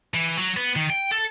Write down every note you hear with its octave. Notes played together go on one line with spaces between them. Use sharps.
E3
F#3
B3
D#3
G5
A4